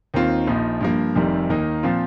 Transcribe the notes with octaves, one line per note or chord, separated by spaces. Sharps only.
D#2 D#3 C4 F4
A#1 A#2 F3 D#4
G2 F3 A#3
F1 F2 C3 D#3 G3
D#2 D#3 A#3 D#4
A#2 F3 C4 F4